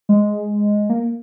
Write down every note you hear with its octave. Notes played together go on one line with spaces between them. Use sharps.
G#3
A#3